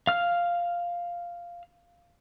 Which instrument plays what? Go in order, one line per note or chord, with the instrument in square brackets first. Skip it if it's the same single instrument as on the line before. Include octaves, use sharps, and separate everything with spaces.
[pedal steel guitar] F5 F6